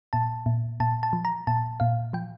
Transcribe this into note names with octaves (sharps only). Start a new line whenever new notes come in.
A#2 A5
A#2
A#2 A5
A5
F3
A#5
A#2 A5
A#2 F5
F3 G5